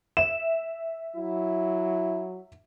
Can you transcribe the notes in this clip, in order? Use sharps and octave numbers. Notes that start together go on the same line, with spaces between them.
E5 E7
F#3 E4